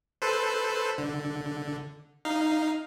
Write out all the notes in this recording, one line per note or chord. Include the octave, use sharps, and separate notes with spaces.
A4 B4 C5
D3
D#4 F5